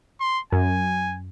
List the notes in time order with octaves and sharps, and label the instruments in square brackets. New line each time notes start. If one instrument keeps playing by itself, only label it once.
[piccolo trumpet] C6
[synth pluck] F#2 [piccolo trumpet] G#5